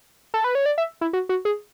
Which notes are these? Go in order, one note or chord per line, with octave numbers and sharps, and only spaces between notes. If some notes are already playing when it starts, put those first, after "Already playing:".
A4
B4
C#5
D5
E5
E4
F#4
F#4
G#4